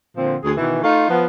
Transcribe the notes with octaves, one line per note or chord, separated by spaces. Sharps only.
A#2 D3 F3 C4
D2 G#4
B2 D#3 E3
A3 D#4 F4
F3 B3